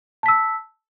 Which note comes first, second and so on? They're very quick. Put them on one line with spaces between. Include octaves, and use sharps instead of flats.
A5 B6 E6